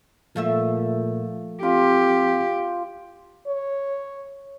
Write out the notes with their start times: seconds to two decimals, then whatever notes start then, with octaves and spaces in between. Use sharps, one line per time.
0.36 A#2 F3 A3 E5
1.63 C4 F4 G4
3.47 C#5